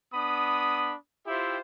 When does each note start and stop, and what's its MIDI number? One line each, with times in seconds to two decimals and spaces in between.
0.13 0.95 59
0.13 0.95 62
0.13 0.95 83
0.13 0.95 87
1.27 1.58 64
1.27 1.58 65
1.27 1.58 67
1.27 1.58 72
1.27 1.58 76
1.27 1.58 79